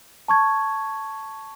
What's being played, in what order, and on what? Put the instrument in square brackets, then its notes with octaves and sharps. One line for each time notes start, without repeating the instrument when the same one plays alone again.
[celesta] A5 C#6 G#6